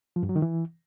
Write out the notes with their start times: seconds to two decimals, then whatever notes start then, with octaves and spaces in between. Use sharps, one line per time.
0.16 F3
0.23 G2
0.29 F#3
0.36 D#3
0.42 E3